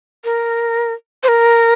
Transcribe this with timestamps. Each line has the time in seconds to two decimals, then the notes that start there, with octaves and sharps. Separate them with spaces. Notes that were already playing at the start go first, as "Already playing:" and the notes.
0.24 A#4
1.23 C5
1.28 A#4